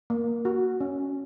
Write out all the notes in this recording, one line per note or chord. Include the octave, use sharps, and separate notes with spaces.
A#3
F#4
C#4